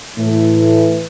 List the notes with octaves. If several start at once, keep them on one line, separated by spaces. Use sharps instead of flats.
A2 E3 A3